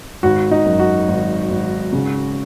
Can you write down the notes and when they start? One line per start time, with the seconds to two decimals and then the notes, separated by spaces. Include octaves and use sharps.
0.23 G#1 F#4
0.51 D#4
0.66 F#2
0.80 F#4
1.08 G#1
1.50 G#1
1.93 C#3